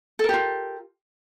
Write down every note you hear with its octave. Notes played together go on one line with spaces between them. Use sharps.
F4 G4 A4 A#4